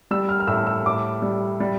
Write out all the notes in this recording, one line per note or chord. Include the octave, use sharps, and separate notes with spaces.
G3 E6
F6
F6
A2 E6
E6
A2 D6
G3
G3